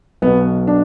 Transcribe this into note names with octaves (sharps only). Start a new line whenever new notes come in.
B1 B2 B3
D4